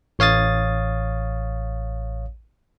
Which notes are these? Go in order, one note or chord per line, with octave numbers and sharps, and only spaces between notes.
A1 C#5 F5 D#6 A6